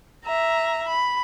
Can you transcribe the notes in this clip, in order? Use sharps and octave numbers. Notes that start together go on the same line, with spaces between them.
E5 A#5
B5